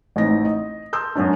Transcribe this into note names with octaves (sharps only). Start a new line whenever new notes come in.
A1 C4 D#4 A#6
D#5
A5 C6 E6 G6
F#2 F#3 C#4 D4